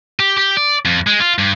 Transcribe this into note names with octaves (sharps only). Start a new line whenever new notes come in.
G4
G4
D5
F2
G#3
F4
G2